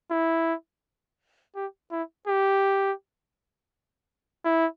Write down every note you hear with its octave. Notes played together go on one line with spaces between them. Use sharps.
E4
G4
E4
G4
E4